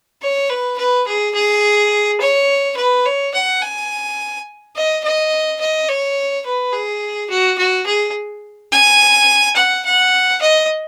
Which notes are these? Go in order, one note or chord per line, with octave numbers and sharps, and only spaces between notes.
C#5
B4
B4
G#4
G#4
C#5
B4
C#5
F#5
G#5
D#5
D#5
D#5
C#5
B4
G#4
F#4
F#4
G#4
G#5
F#5
F#5
D#5